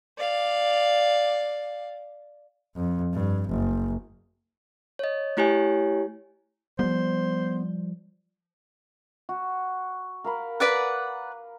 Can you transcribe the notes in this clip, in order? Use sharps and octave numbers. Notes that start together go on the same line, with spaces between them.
D5 F5
F2
G2
F#1
C#5 D#5
A3 E4 G4 C#5 G#5
F3 G3 B3 C5
F#4
A#4 F5 B5
B4 D5 F#5